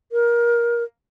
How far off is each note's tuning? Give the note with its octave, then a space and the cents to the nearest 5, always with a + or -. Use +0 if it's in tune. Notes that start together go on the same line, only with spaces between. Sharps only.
A#4 +20